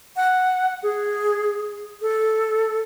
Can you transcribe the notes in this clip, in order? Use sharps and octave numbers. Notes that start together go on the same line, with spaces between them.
F#5
G#4
A4